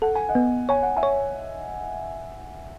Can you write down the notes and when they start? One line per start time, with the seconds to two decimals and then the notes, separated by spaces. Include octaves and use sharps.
0.02 A4 F#5
0.15 G#5
0.29 D#5 F#5
0.35 B3
0.69 C#5 G#5
0.83 F#5
0.97 E5 G#5
1.03 C#5